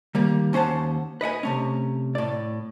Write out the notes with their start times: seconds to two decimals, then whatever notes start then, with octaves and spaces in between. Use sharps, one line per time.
0.15 D#3 G3 A#3
0.53 D#2 C#4 C5 F#5 A5
1.21 B4 D#5 F#5 G#5
1.43 C3 A3 C#4
2.15 A2 D5